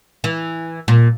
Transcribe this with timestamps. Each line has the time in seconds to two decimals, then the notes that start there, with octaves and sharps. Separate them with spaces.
0.24 E3
0.88 A#2